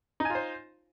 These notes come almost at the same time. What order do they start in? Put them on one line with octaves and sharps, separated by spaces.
D#4 G#5 F4 C5